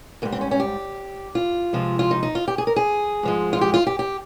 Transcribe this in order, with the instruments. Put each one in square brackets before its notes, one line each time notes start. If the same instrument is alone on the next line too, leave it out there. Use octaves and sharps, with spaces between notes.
[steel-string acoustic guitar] G#2 A#3
G3
C4
C#4
C#4
G4
F4
C3 F3 G#3
F4
D#4
D#4
F4
G4
G#4
A#4
G#4
G#2 F3 G#3
F4
G4
F4
G4
G4